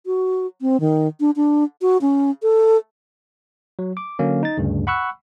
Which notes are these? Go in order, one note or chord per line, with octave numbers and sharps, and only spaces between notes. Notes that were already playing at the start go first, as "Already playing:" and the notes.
F#4
C4
D#3
D4
D4
F#4
C#4
A4
F#3
D6
D3 F#3 A#3 C#4
D#4 A6
D2 G2 C#3
F#5 B5 C#6 E6 F#6